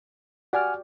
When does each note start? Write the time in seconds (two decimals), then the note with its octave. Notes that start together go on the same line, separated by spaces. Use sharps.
0.53 F#4 G4 D5 F#5 G#5 F6